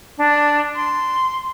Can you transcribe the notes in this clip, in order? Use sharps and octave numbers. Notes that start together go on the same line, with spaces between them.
D4
C6